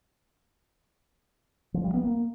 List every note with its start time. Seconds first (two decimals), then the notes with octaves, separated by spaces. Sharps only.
1.74 F3
1.84 G3
1.94 B3
2.04 A#3